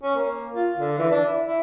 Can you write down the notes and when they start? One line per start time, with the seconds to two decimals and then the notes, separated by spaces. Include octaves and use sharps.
0.03 C#4
0.16 A#3
0.53 F4
0.78 D3
0.98 E3
1.11 D4
1.28 E4
1.47 E4